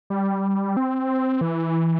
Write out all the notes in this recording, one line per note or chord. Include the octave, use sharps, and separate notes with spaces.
G3
C4
E3